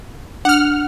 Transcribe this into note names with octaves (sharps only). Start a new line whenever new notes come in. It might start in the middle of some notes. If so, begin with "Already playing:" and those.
D4 F#5 F6